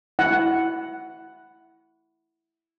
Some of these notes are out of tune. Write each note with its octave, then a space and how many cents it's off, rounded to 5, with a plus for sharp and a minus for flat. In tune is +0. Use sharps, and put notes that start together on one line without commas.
E4 +0 F#5 +5